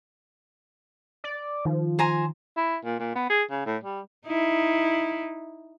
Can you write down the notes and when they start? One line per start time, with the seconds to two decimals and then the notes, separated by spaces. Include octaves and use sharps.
1.24 D5
1.65 D#3 F3
1.99 C5 G#5 A#5
2.57 E4
2.84 A#2
2.99 A#2
3.15 B3
3.29 G#4
3.51 C#3
3.66 A2
3.84 G3
4.26 D#4 E4